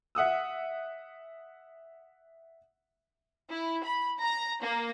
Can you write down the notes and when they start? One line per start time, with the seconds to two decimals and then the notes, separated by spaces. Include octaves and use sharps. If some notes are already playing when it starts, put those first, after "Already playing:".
0.15 E5 F#5 D#6 E6
3.50 E4
3.82 B5
4.20 A#5
4.62 A#3